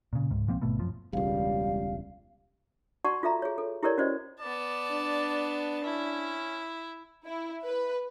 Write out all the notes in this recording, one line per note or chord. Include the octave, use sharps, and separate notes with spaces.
A#2 C#3
C#2 G#2
B1 F3 A#3 C4
G#1 B2 A3 B3
F#2 F3
E1 C#2 G3 F5
F#4 D5 F#5 A5 C6 C#6
F4 A4 E5 A#5
G#4 C#5
A4
E4 G4 A4 A#4 C#5 D5
C#4 F#4 C5 D5 D#5
B3 D5 A5
D4
C#4 E4
E4
B4